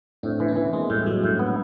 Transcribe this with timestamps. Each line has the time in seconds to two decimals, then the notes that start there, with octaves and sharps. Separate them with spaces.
0.23 A2 C4 D4
0.40 E3
0.48 B3 C#4
0.56 E3
0.73 G#3 A#3 C4
0.89 A2 G3 A3
1.06 A2 F#3 G#3
1.24 A2
1.39 B3